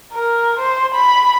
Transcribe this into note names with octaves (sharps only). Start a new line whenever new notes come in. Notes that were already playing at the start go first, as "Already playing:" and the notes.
A#4
C5
B5